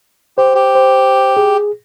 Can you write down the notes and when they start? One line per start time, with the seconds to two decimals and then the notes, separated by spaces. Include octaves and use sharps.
0.38 G4 C5
0.55 G4
0.75 C5
1.37 G#4